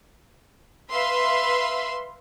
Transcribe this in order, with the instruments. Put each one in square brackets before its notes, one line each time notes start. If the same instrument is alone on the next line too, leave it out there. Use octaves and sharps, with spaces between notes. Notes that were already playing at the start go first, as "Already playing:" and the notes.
[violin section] B4 E5 F5 C6